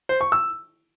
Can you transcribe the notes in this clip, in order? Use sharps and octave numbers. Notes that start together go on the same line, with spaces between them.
C5
C#6
E6